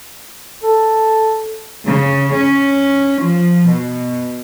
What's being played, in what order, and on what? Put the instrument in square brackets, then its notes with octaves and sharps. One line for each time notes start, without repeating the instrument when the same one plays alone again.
[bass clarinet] A4
[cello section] C#3
C#4
F3
B2